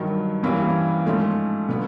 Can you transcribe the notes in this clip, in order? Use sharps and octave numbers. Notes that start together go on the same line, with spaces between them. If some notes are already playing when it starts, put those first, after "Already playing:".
Already playing: G2 D#3 F#3
G2 E3 G3 A#3 C#4
G#2 F3 A3 C#4
D3 F#3 B3